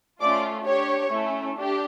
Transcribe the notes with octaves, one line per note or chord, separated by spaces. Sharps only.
A3 C#4 F4 D5 D6
D4 G4 C#5 C#6
A3 C#4 E4
D4 G4